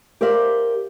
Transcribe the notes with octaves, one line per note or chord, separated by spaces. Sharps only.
G4 A#4 C5 D5 E5 F5